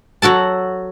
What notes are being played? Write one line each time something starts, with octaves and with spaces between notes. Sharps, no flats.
F#3 F#4 A4 A5